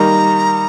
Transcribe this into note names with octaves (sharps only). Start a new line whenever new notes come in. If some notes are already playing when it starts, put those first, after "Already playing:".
Already playing: D#3 G3 A#3 D#4 A#5